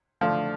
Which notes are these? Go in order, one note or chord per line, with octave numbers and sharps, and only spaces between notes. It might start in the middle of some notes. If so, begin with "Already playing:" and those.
D3 F3 A3 D4